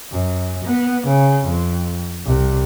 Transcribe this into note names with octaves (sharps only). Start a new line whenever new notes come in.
F#2
B3
C#3
F2
C2